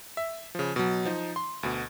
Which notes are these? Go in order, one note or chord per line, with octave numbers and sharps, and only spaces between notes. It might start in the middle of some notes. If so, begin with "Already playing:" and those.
E5
C#3 F3
B2 F#3
F3 D#4
C6
D2 B2